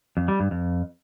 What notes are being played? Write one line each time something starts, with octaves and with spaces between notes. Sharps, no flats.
F2
G3
G2
F2